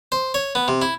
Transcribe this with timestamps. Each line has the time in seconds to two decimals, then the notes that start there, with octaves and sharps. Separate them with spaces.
0.12 C5
0.34 C#5
0.55 B3
0.68 C3
0.82 E4